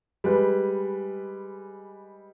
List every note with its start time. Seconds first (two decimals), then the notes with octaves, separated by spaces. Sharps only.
0.24 G3 G#3 B4